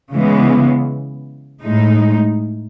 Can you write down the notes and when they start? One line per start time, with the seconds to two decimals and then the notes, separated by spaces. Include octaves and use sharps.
0.13 C#3 E3 G#3 B3
1.61 A2 G#3 D#4